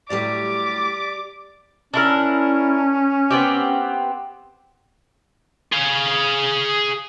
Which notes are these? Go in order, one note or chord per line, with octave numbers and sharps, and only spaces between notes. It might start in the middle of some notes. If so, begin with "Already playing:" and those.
A2 F#3 G3 G4 D5 D6
C#4 D4 E4 A#4
B3 C4 G4
G#4 F5